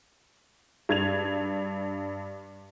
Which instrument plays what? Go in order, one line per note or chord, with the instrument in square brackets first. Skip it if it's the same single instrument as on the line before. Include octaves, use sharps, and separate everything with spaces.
[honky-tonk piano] G2 G#6 F7